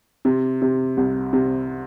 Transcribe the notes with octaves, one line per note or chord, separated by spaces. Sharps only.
C3
C3
C2
C3